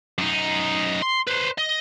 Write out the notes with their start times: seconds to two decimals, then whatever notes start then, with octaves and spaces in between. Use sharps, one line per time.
0.18 F#2 D#4
1.02 C6
1.27 B4 C5
1.58 D#5